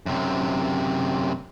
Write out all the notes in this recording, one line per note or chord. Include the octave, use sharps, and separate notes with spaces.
F#2 C3